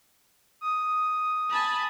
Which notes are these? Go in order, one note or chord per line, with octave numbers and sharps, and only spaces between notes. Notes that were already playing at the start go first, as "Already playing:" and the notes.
D#6
G#5 A5 B5